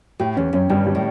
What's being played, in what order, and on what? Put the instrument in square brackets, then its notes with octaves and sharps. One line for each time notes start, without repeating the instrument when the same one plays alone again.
[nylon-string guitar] A2 [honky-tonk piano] G4
[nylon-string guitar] E2 [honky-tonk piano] C#4
[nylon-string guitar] F#2 [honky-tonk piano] C#4
[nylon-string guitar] G2 [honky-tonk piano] G3
[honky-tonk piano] G3
[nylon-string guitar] A2